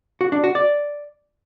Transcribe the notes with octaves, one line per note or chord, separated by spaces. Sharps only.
F#4
D4
F#4
D5